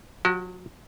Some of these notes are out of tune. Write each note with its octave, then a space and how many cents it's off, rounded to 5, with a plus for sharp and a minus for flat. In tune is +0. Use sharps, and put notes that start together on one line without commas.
F#3 -35 F#4 +40